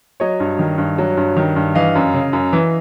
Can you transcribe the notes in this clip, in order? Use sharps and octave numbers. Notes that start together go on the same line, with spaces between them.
F#3 C#5 D#5
G2
D#3
G2
F#3
G2
D#3
G2
E3 D#5 F5
F#2
C#3
F#2
E3